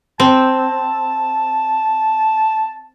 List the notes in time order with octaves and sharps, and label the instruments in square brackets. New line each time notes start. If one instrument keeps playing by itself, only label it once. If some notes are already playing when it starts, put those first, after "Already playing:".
[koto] C4 [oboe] A5